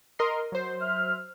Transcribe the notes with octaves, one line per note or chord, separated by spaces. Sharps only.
A#4 D#5 C6
F#3 C5
E5 F6